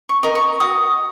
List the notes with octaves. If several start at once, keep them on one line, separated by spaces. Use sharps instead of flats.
C#6
A#4 D#5
C#6
F#4 D#6